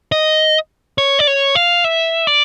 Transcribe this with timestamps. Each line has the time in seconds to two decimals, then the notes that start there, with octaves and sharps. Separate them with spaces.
0.12 D#5
0.98 C#5
1.19 D5
1.27 C#5
1.55 F5
1.84 E5
2.27 D5